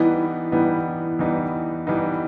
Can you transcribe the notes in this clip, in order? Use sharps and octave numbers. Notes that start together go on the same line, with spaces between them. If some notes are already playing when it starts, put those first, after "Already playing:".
Already playing: E3 G3 B3 D#4 E4
E3 G3 B3 D#4
E3 G3 B3 D#4
E3 G3 B3 D#4